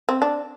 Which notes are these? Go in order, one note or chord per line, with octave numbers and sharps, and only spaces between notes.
C4
D4